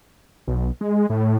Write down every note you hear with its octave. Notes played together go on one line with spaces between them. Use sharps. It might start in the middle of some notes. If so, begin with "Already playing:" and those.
B1
G#3
A2